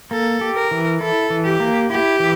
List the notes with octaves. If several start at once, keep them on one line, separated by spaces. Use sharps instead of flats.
A#3 A4
G4
A#4
E3
E4 A4
E3
G4
A#3
E4 G4
E3